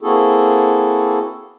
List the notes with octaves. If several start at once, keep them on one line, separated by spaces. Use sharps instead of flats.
A#3 C4 E4 F#4 G#4 A4